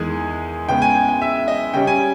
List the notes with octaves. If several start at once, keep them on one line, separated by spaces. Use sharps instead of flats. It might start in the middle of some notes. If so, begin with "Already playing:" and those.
Already playing: E2 D#3 G#3 G#4
C#3 G#3 B3 G5
G#5
G5
G5
E5
D#5
C#3 G3 C#4 G5
G#5